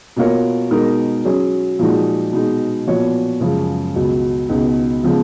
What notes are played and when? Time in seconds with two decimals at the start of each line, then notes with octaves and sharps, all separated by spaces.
0.16 B2 A#3 F4 A#4 C#5
0.70 B2 G#3 D#4 A#4
1.25 F#3 C#4 G#4
1.79 A#2 F3 G#3 D#4 F#4
2.33 B2 G#3 B3 D#4
2.87 A#2 F3 B3 F#4 C#5
3.41 F#2 C#3 F3 G#3
3.95 C#2 B2 F#3
4.49 C#2 B2 G#3 B3 D#4
5.03 C#3 F3 G#3 B3